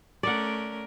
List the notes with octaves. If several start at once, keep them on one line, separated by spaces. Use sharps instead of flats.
A3 C#4 A#4 D5 F#5